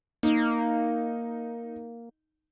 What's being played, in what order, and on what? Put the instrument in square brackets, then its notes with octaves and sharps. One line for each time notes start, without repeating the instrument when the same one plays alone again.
[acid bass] A#3 [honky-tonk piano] D#4